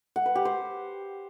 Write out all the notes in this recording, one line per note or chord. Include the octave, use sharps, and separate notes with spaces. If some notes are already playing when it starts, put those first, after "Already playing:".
F#5
B4
G4
C5